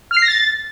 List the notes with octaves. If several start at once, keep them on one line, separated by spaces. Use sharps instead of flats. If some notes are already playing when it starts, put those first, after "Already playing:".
F6
C7
A#6
A6